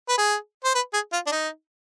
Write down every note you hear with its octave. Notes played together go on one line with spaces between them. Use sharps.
B4
G#4
C5
B4
G#4
F4
D4
D#4